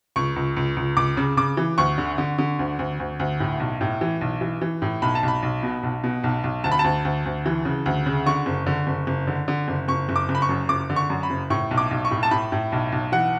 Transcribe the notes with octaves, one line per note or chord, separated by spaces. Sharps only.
C#2 C#6
C#2
C#2
C#2
C#2 D6
C#3
C#3 D6
E3
D2 C#6
D3
D3
D3
D2
D2
D2
D2
A2
B1
A2
E3
B1
E3
E3
A2
B1 B5
A5
B1
B5
B1
B2
B1
B2
B1
B1
D2 A5
B5
A5
D2
D2
D2
E3
C#3
D2
C#3
D3 C#6
F#1
D3
F#1
F#1
D3
D3
F#1
F#1 C#6
F#1
D6
F#1
B5
C#6
F#2
F#1 D6
D3
C#6
F#2
B5
F#1
A2 C#6
B1
D6
B1
C#6
A2
A5
A2 B5
A2
B1
B1
E3 F#5